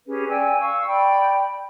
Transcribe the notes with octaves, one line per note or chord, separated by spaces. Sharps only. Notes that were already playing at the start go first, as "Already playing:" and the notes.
C#4 G4 G#4 B4
D5 G5 G#5 E6
F5 C#6 E6
D5 G5 B5